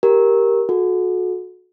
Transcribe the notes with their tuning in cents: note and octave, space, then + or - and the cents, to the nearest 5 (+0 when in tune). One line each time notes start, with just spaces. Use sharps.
G4 +0 A#4 +0
F#4 -25 A4 -35